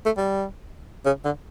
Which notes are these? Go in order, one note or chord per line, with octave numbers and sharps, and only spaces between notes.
A3
G3
C#3
D3